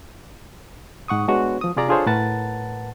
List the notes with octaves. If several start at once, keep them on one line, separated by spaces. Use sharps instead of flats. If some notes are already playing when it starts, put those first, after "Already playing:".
G#2 F#5 C#6 D#6
G#3 B3 D4 F#4 B4 C#5
F3 D#6
C3 F4 G#4 D5 A#5
D4 F4 G#4 A4 C5 C#5
A2 A#4 B4 F#5 A5 A6